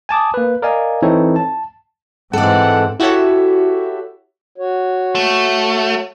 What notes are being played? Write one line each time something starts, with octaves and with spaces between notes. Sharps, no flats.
G#5 A5 D6 D#6
A#3 B4
A#4 D5 D#5 F5 G#5
E3 C4 D#4 E4 A4 C#5
A5
G#2 E3 G#3 C4 A4 D5 F#5
E4 F#4 G4 A4 C#5 E5
F#4 C#5
A3